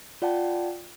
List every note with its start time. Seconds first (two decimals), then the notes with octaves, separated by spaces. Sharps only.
0.22 F4 D5 F#5 G5 A5